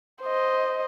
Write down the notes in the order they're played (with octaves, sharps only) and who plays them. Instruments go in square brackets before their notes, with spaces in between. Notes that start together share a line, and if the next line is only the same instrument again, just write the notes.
[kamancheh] C5 D#5